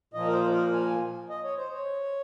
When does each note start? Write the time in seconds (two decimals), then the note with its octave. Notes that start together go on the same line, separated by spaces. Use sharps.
0.14 A#2 F3 A#3 D#5
0.28 A#4
0.33 C5
0.52 A#4
0.72 G#5
1.30 D#5
1.44 C#5
1.58 C5
1.73 C#5